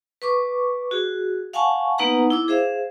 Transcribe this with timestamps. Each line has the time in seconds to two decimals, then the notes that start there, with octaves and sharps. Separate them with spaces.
0.22 B4 C#6 D6
0.91 F#4 G#4
1.53 F5 F#5 G#5 A5 C#6
1.98 A#3 B3 D#4 B4 F#5 A#5
2.30 E4 D6 E6
2.48 G#4 C5 E5 F5